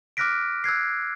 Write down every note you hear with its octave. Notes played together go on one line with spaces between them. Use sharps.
D6 F6 F#6 A#6 B6 D7
E6 F#6 G#6 C7